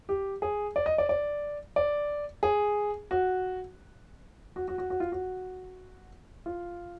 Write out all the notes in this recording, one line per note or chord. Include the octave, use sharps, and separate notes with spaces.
G4
G#4
D5
D#5
D5
D5
D5
G#4
F#4
F#4
F#4
F#4
F#4
F4
F#4
F4